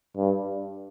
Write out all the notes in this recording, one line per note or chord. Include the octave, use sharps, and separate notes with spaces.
G2